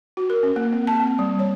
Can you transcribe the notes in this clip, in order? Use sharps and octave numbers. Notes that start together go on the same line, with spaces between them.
F#4
A#4
C#4
A#3
C4
A5
C4
G3
C#5